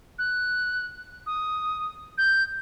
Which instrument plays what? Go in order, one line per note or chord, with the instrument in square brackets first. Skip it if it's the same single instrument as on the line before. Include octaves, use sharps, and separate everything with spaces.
[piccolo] F#6
D#6
G6